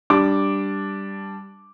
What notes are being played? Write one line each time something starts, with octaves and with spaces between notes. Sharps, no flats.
G3 D4 D6